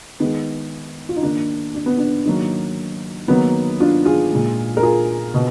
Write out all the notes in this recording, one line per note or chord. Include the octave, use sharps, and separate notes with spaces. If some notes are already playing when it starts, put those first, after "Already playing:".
D#3 G#3 B3
F4
D#4
D#3 A#3 D4
D4
B3
D4
D#3 F#3 A#3
D#3 F#3 A#3 B3 D#4
D4 F4
F4 G#4
A#2 G#3
A#4
F4 G#4
B2